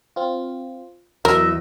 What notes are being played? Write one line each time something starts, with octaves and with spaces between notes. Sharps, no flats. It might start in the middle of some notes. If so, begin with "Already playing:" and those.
C4 F4
E2 F#3 A#4 D#5 E5